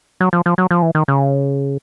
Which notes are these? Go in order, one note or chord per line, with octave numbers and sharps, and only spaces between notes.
F#3
F3
F3
F#3
F3
E3
D#3
C#3